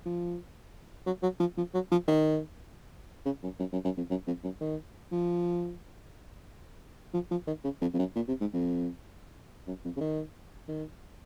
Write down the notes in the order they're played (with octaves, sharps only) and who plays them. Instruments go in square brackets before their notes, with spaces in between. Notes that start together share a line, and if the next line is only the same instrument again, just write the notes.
[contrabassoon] F3
F#3
F#3
F3
F3
F#3
F3
D#3
C#3
F#2
F#2
F#2
F#2
F2
F#2
F2
F#2
D#3
F3
F3
F3
D#3
C#3
F2
F2
F#2
A#2
C3
G#2
F2
F#2
F2
C#3
D#3
D#3